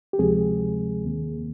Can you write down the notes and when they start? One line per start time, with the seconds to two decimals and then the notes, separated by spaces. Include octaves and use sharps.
0.13 G4
0.18 D2 C3 F3 G#3 C4 G#4
1.04 D#2 D#3 A#3